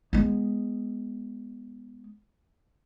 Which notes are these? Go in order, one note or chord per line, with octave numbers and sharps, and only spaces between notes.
G#3 B3